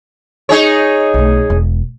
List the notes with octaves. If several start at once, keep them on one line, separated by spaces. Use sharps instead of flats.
D#4 G#4 C#5
B1 A3
E1